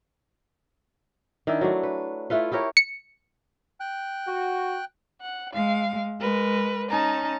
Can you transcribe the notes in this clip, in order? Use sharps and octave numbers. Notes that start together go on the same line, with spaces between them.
D#3 D4 E4
F#3 A3 D4
B4
A3 E4 F4 B4
E4 G4 A#4 C#5
C#7
G5 F#6
F#4
F#5
G#3 F5
G#3 A#4 B4
C#4 D#4 A5 A#5